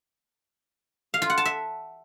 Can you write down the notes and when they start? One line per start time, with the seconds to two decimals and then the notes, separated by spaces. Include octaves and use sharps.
1.14 F5
1.22 F4
1.30 F#5
1.38 A5
1.45 E5